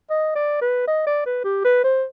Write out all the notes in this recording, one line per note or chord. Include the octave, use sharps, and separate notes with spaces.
D#5
D5
B4
D#5
D5
B4
G4
B4
C5